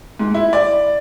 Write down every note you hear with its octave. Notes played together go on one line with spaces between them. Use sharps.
G#2
E4
D5